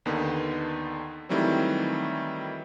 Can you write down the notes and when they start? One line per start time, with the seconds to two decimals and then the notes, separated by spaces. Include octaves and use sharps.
0.06 D#2 D3 D#3 B3
1.29 D#3 E3 F#3 G3 A3 C4